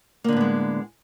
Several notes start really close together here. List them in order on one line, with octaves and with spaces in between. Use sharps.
A#3 D3 A2 B3 G#3